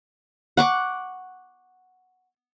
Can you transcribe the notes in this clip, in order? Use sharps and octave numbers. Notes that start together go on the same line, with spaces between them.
F#5 C#6 D6